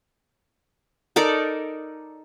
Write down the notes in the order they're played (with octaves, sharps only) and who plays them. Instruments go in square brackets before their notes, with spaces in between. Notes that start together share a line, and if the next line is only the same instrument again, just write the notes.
[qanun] D#4 A4 A#4 D5